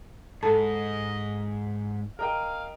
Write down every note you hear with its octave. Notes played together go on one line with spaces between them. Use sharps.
G#2 A4 D#5 A5 B5
A#4 D#5 F5 G5